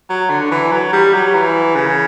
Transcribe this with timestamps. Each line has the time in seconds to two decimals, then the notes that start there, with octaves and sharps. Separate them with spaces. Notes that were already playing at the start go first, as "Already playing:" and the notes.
0.10 F#3
0.30 D3
0.51 E3
0.72 F#3
0.93 G3
1.14 F#3
1.34 E3
1.76 C#3